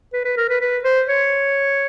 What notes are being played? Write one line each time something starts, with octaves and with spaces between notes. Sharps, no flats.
B4
B4
A#4
B4
B4
C5
C#5